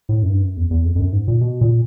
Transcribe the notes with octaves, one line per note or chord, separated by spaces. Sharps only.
A2
F#2
G2
F#2
E2
E2
F2
F2
F#2
G#2
A#2
B2
A#2